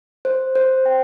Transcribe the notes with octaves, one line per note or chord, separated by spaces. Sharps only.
C5
C5
G5